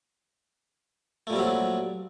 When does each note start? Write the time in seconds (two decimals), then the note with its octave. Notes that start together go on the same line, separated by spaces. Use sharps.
1.27 A3
1.30 A#2
1.33 G3
1.36 C4
1.39 F#3